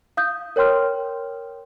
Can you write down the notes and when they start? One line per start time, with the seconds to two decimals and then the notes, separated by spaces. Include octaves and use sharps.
0.17 F5 D#6 G6
0.56 A#4 C#5 G5 C6 F6